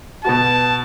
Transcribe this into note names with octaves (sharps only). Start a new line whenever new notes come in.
B2 B3 F#4 A5